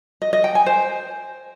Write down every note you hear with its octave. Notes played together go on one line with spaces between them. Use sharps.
D#5
D#5
G5
G#5
C5